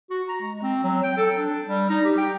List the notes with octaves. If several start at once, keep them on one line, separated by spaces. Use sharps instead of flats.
F#4
A#5
G#3
C4
F#3
G5
A4
D4
G3
D#4
G4
G5